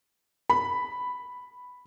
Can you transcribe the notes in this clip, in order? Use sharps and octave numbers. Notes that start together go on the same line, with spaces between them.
B5